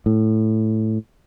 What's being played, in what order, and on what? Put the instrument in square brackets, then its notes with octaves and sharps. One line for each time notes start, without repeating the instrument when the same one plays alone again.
[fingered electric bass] A2